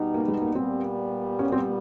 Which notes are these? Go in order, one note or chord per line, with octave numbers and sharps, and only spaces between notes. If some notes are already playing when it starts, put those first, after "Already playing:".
Already playing: B2 G3 B3 D#4
A#3
G#3
A#3
A#2 G3 B3 C4
C#4
C4